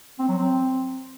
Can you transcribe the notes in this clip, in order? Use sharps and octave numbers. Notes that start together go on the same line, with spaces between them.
C4
F#3
C4